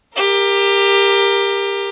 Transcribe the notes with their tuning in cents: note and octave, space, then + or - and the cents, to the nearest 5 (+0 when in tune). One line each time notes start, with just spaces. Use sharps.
G4 +20 A#4 +0